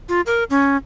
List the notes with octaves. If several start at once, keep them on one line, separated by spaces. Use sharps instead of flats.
F4
A#4
C#4